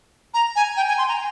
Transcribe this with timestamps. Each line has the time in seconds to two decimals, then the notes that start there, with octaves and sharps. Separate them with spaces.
0.34 A#5
0.56 G#5
0.77 G5
0.88 G#5
0.98 C6
1.08 A#5